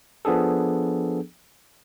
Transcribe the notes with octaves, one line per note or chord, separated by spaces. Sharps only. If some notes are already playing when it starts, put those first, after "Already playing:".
F3 B3 D4 G#4 A4